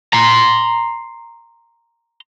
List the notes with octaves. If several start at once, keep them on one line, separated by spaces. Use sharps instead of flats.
A#5 C6